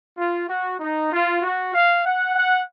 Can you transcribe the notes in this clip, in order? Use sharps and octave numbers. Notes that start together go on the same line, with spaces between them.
F4
F#4
D#4
F4
F#4
F5
F#5
F#5